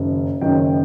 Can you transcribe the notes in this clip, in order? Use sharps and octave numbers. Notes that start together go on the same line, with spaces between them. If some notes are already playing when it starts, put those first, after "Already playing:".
Already playing: F#1 F#2 D#3
F#1 F#2 D#3 G5